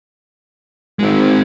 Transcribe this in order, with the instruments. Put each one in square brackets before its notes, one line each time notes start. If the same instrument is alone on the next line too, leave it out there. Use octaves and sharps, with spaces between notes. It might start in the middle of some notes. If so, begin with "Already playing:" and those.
[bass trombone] G#1 [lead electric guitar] G#3 C4